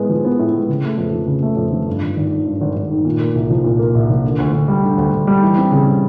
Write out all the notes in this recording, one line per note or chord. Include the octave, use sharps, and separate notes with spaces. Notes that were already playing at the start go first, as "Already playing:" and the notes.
Already playing: A2 G#3 B3
F3
B3
A2
G#3
C#3
A3
F2
F3
C#3
A3
F2
F3
G2
G#1
G#1
D#3
G2
G#1
G#1
D#3
A#2
A#3
C2
F3
A#2
A#3
C2
F3
D3
D2
D2
G3
D3
D2
D2
G3
E3
C4
C#3
G3